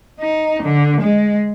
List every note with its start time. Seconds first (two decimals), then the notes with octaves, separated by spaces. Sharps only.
0.20 D#4
0.63 D3
1.01 G#3